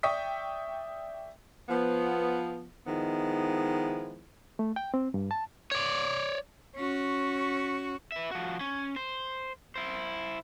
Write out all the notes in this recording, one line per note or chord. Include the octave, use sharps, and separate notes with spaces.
D5 E5 G5 C#6 D#6 B6
F3 B3
D#3 F3 G#3 B3 E4
A3
G5
C4
G2
A5
C#5 D5
C#4 F#4
B4 E5
F3 F#4
C#4
C5
E4 C5